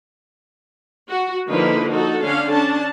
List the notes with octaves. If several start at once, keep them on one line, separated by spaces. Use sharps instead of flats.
F#4
D3 F3 A#3 D#4 E4 B4
D#4 F#4 A4
D3 C#4 D4 F5
C#4 D4 A5